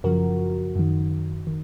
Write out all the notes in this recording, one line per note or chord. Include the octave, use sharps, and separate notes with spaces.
F#2 C#3 F3 F#4 A#4
F#2 D#3
D#3